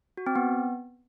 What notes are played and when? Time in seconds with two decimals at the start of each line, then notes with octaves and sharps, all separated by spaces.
0.17 F#4
0.27 C4
0.36 B3